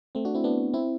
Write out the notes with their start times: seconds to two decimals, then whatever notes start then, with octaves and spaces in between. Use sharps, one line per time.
0.15 A3 C4
0.25 D4 F#4
0.35 C4 E4
0.44 B3 D4
0.73 C4 E4